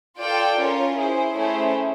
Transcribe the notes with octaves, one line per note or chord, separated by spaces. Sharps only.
F4 A4 D5 G5
C#4 F4 A#4 C#5
E4 G#4 C5
A3 C#4 E4 G#4 C5